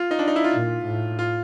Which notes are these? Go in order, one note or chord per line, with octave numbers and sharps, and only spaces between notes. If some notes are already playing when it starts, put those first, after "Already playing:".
Already playing: F4
D#4
D4
D#4
E4
F4
A#2
A2
F4